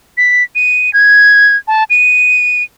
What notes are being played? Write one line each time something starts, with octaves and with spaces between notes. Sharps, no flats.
B6
D#7
G#6
A5
D#7